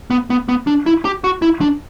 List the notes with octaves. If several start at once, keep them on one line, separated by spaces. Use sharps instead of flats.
B3
B3
B3
D4
E4
G4
F#4
E4
D4